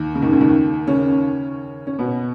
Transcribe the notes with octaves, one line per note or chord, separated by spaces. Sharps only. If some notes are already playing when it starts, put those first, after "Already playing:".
Already playing: D#2 D#3
C#3
D#2 D#3
C#2 C#3
D#2 D#3
C#3 C#4
C#4
B2 B3